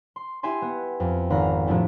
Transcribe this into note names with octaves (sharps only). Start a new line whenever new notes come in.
C6
E4 G4 E5 G#5 C6
B3
F2
G#1 F5 A#5 B5
A2 F3 A3 D4 E4 G4